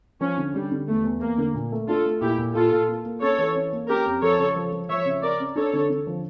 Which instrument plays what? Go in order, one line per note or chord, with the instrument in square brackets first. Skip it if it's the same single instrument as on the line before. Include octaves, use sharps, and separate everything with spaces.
[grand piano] F3 [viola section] C#4
[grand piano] D3
[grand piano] D3 [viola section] G3
[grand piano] D3
[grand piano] E2 [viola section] A3
[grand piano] E2
[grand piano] E2 [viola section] A#3
[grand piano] D3
A#2
A3
[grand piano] D4 [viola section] F4 A4
[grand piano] A3
[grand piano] A#2 [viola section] E4 G4
[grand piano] A#2
[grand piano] A#2 [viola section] F4 A4
[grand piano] A#2
A#3
A#3
[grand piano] C#4 [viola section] A4 C#5
[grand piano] E3
C#4
A#3
[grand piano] C#4 [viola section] G4 A#4
[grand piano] F2
[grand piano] F3 [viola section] A4 C#5
[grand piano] C#3
F3
F3
[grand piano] F3 [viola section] C#5 E5
[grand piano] C#3
[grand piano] C#4 [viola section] A#4 D5
[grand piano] C#4
[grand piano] D4 [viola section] A4 C#5
[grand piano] D3
D3
F3